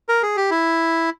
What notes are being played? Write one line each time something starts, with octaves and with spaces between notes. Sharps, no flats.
A#4
G#4
G4
E4